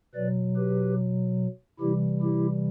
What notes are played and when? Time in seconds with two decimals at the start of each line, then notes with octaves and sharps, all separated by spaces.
0.14 B2 F#3 B4 D5
0.56 G4 B4
1.80 C3 E3 G3 E4 G4
2.22 E4 G4